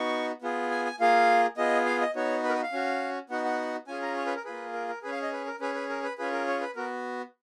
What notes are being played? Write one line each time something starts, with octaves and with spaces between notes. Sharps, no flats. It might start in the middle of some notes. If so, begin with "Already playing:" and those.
Already playing: B3 D#4 F#4 C#6
B3 F4 G#4
G#5
G#5
A#3 F4 G#4 F5
B3 F4 G#4 D#5
F5
D#5
B3 D#4 F#4 C#5
B4
A#4
B4
F5
C#4 F#4
B3 D#4 F#4 F#5
F#5
C#4 F4 G#4 G#5
A#5
C#5
B4
A#4
A#3 F4 G#4 B4
A#4
A#4
C#4 G#4 B4
F5
D#5
B4
A#4
C#4 G#4 B4
B4
A#4
B4
C#4 F4 G#4 B4
A#4
C#5
B4
B3 F#4 A#4